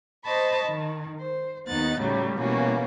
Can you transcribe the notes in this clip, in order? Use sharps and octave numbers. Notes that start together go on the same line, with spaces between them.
C5 D#5 A5 B5 C#6
D#3
C5
D#2 B3 D#4 F#6 A6
A2 C#3 F#3 G3 A3
B2 E3 G3 A#3 C#4 F#4